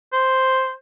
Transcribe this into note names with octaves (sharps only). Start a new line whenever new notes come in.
C5